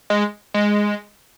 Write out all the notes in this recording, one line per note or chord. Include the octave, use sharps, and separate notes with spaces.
G#3
G#3